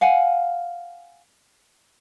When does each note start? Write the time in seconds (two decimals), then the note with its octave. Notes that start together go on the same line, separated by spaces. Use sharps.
0.01 F5 F#5 G#5